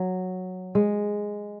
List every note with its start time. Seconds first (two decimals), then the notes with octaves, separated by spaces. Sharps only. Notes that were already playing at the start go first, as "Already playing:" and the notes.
Already playing: F#3
0.75 G#3